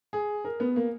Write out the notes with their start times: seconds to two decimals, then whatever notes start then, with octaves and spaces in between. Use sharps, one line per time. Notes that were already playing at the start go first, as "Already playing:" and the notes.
0.13 G#4
0.45 A#4
0.60 B3
0.76 A#3